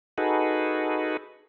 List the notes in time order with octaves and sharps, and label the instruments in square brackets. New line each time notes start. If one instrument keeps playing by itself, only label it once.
[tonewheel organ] D#4 F#4 G#4 A4 B4